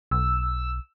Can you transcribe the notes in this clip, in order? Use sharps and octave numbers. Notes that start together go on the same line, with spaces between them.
B1 E6